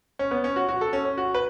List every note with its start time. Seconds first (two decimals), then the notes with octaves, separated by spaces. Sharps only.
0.19 C#4
0.31 B3
0.44 C#4
0.56 F#4
0.68 F#4
0.81 A4
0.93 C#4
1.05 C#4
1.18 F#4
1.35 B4